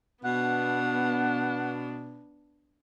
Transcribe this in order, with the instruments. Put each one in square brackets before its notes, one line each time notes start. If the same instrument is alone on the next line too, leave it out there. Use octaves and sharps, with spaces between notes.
[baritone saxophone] B2 [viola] B3 D4 [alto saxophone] F#5